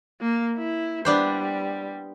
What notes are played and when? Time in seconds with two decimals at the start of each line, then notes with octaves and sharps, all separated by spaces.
0.21 A#3
0.58 E4
1.05 G3 B3 D4 C5